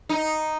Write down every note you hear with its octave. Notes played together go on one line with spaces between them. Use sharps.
D#4